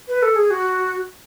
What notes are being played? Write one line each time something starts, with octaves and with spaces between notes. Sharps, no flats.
B4
A4
G#4
F#4